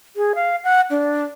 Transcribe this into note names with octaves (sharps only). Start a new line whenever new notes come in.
G#4
F5
F#5
D4